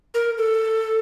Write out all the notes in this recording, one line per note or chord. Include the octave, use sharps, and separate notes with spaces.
A#4
A4